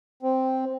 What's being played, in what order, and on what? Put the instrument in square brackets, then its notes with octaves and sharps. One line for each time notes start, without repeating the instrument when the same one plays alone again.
[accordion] C4